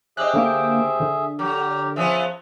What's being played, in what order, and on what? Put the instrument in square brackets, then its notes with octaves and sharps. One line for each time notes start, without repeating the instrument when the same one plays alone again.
[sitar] C4 G4 [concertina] G#4 E5 [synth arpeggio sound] D#5 F#6
[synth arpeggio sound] D3 A#3 D7
D3
[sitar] F#3 [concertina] G4 A#4
[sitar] F3 B3 C#4 [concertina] G#4 E5